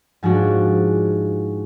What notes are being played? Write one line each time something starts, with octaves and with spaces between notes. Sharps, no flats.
G#2 F3 G#3 D4 F#4